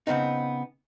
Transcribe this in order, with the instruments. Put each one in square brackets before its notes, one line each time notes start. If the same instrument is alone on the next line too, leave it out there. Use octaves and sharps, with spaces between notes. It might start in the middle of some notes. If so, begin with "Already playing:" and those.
[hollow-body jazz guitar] C#3 B3 C4 D#4